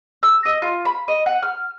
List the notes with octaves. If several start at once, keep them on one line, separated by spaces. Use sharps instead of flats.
E6
D#5
F4
B5
D#5
F#5
F6